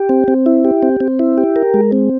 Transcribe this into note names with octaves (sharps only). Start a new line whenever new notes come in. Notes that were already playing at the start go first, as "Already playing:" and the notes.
Already playing: G4
C4
C4
E4
G4
C4
C4
E4
G4
A#4
G#3
C4